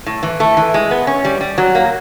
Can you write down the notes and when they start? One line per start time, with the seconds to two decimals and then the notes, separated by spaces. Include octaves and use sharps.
0.06 A2
0.23 E3
0.40 A3
0.57 E3
0.74 G#3
0.91 B3
1.07 C#4
1.25 G3
1.41 G3
1.58 F#3
1.75 A#3